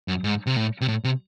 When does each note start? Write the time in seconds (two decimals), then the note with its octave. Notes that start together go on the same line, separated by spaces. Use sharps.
0.08 F#2
0.24 G#2
0.47 C3
0.57 A2
0.81 C3
0.88 A2
1.04 C3